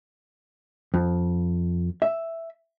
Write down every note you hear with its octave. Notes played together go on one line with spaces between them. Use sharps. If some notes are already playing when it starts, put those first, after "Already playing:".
F2
E5